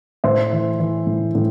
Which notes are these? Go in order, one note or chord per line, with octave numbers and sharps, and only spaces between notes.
A2 C5 E5
E3
E3
A2
A2